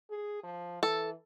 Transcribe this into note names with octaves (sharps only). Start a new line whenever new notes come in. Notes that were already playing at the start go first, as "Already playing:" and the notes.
G#4
F3
E3 A4